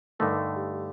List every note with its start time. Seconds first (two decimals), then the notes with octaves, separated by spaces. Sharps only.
0.19 G2 D3 A3 D#4 A#4
0.56 G4
0.74 G4